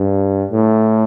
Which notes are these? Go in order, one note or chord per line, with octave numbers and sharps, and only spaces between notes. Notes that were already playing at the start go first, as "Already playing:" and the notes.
Already playing: G2
A2